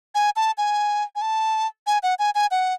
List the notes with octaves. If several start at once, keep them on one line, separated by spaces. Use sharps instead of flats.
G#5
A5
G#5
G#5
A5
G#5
F#5
G#5
G#5
F#5